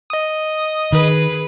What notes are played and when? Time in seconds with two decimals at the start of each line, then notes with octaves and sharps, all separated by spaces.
0.10 D#5 D#6
0.92 D#3 G#4 B4